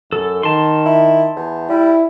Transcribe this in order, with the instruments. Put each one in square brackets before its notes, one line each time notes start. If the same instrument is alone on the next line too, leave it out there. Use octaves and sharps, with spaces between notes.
[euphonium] F#2 [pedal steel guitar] A4
[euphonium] D#3 [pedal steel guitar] A5 C6
[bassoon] E4
E2
[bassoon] G3 [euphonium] E4